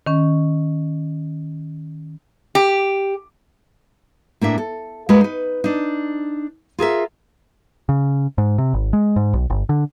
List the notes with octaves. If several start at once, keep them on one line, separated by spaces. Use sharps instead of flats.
D#3 C#4
G4
A2 A#3 D4 E5
A4
G#3 A#3 F#4 G#4 B4
D#4 B4
D4 D#4
F4 G#4 A#4 E5
C#3
G#2
C3
G#1
G#3
G#2
B1
G1
D3